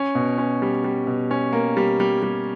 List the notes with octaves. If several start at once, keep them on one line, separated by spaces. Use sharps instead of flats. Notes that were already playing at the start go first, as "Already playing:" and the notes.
Already playing: C#4
B2
C#4
G3
G3
B2
C#4
A#3
G3
G3
G3